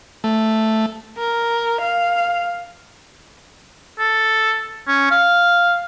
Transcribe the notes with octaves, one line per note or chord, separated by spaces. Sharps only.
A3
A#4
F5
A4
C#4
F5